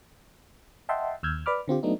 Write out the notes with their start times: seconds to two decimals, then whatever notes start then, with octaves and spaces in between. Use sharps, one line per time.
0.89 D#5 E5 F#5 G5 A5 C6
1.23 D#2 E6 F6 G6 G#6
1.46 B4 D5 B5 D6 F6
1.68 D3 C4 F4 G4
1.83 F#3 A3 B3 D4 D#4